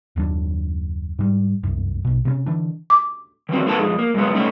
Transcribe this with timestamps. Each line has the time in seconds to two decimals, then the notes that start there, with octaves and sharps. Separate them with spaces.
0.16 F#1 D#2 F#3 D4
1.19 G#2 G3
1.63 G1 C2 F#2
2.05 A#1 B2
2.25 C3 B3 C#4
2.46 D3 E3 D4
2.90 D6
3.49 D#3 E3 F#3 C4
3.66 A#3 C4 D#4 A4 B4 A5
3.79 F2 G#3
3.99 A#3
4.14 F#2 G#3 B3
4.35 A3 C#4 D#4